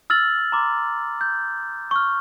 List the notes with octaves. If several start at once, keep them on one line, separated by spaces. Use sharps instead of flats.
E6 F6 A6 F#7
A#5 C6 D6
G6
C#6 F6